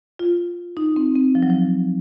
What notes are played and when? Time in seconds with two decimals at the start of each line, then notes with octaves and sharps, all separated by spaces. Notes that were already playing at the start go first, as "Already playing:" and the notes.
0.19 F4
0.77 D#4
0.96 C4
1.15 C4
1.35 F3
1.43 F#3
1.50 F3